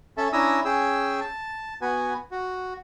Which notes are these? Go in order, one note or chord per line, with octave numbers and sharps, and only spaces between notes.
C#4 A4 E5 A5
C#4 D4 E4 A#5 D#6 E6
C#4 G#4 G5 E6
A5
B3 F#4 B4 G#5
F#4